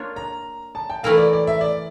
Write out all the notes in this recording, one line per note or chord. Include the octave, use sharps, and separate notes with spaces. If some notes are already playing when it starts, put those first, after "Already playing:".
Already playing: A#3 D4 F4 C#5
A#5
A5
G5
E3 A3 E4 A#4 F5
D5
D5
E5
D5